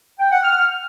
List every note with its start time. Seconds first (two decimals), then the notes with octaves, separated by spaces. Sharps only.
0.19 G5
0.31 F#5
0.43 F6